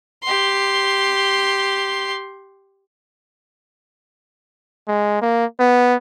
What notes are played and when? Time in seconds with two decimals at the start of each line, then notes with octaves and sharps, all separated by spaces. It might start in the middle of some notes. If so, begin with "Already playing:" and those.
0.24 G4 C6
4.88 G#3
5.21 A#3
5.60 B3